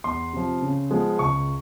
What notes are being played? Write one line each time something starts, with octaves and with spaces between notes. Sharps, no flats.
E2 C6
C3 F3
C#3
F3 G#3 B3
C#2 C#6